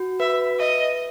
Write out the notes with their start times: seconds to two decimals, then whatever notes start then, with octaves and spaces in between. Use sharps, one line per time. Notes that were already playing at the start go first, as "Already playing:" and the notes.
Already playing: F#4
0.20 B4 E5
0.59 D#5 E5